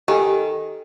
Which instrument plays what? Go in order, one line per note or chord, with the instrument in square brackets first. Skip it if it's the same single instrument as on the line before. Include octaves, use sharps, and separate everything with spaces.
[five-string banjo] D#3 [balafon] G4 A4 G#5